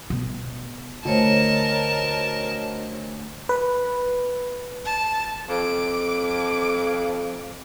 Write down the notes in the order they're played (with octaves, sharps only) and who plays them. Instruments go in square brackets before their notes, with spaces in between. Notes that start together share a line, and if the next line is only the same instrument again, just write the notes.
[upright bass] A1 B2
[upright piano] D2 [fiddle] A#4 A5 [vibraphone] C5 C#5 D#5
[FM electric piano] B4
[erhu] A5
[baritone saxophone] F2 [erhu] D6